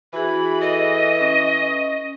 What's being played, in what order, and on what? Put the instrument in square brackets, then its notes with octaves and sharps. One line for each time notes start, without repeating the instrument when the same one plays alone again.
[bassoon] E3 [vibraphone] F#4 G#4 [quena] B5
[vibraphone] A4 [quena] D#5
[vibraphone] C#4